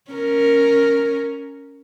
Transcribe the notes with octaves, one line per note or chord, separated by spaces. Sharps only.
C#4 A#4